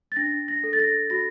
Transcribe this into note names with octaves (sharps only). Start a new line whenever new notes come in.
A6
D4 A#6
A#6
A4
A6
A#6
F#4 A#6